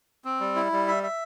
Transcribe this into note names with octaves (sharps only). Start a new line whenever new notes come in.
C4
G3
E4
G3
E5
E5